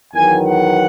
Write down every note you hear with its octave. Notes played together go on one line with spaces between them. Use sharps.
E2 D#3 F#3 B3 G#5
F#5